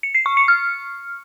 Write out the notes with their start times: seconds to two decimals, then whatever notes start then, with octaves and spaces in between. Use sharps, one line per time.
0.03 C#7
0.15 C7
0.26 C#6
0.37 C#7
0.48 F6